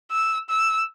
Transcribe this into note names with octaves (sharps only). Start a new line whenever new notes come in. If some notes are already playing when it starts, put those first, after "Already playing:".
E6
E6